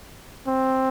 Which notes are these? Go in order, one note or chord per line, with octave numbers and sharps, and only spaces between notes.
C4